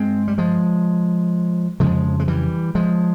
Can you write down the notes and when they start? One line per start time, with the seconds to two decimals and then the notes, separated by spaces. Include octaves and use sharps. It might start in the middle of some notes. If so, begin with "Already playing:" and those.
Already playing: G2 G#3 C4
0.28 G3
0.38 F3 G#3
1.80 F2 C#3 F3 G#3
2.20 G#3
2.28 E3 G3
2.75 F3 G#3